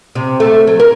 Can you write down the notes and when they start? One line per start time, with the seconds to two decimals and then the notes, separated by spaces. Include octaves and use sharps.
0.15 C3
0.40 A3
0.67 F#3
0.80 A#4